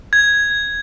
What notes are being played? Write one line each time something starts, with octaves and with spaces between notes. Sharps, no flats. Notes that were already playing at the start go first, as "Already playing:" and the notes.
G#6